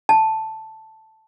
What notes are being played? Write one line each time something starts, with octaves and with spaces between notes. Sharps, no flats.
A5